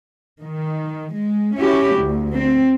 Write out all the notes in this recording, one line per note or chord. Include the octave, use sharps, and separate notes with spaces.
D#3
G#3
C#4 E4 F#4 G4
D2
C4